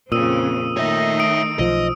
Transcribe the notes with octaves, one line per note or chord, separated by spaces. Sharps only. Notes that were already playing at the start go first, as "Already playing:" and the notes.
F2 A#2 C#3 C4 D#6 E6 D#7
D#3 A3 D#4 C#5 E5
D#6 D7
B1 F3 D#5